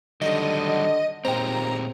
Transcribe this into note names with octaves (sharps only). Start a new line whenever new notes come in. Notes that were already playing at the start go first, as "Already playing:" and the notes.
D3 D#3 F#3 G3 D#5
D#2 A#2 G#3 C4 C5 G5 A#5